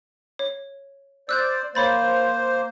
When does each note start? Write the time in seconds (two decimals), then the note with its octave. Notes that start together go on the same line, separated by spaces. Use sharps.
0.39 C#5
1.29 C5 D5 E6 F#6 G6
1.75 A#3 C5 C#5 B5 A6